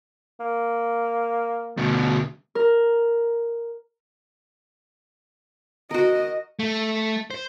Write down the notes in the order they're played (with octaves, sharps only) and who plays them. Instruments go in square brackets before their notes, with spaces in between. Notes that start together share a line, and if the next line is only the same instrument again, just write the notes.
[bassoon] A#3
[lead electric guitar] D2 B2
[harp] A#4
[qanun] F#4 A#4 [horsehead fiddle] D#5
[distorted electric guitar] A3
C5